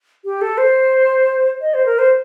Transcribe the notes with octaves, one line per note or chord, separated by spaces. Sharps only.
G4
A4
C5
D#5
C5
A#4
C5